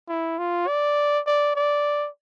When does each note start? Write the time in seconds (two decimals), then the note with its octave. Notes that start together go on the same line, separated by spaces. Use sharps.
0.09 E4
0.39 F4
0.67 D5
1.26 D5
1.55 D5